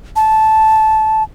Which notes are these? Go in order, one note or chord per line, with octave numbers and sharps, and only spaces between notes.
A5